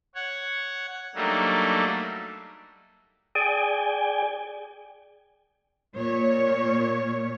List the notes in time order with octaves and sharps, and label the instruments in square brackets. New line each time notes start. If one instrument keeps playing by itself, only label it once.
[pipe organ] C#5 F#5
F#3 G3 A3 A#3 D4 D#4
[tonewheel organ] G#4 D5 G5 G#5
[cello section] A#2 C#5